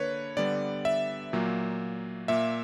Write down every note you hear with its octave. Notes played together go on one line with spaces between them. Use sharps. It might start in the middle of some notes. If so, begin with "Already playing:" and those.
Already playing: D3 A#3 B4 C#5
D3 G3 B3 D5
E5
A#2 F#3 A#3
A#2 A#3 E5